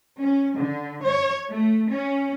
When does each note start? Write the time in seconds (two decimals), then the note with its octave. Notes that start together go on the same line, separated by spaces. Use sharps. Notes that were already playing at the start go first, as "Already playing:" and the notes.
0.17 C#4
0.56 D3
1.01 C#5
1.47 A3
1.89 C#4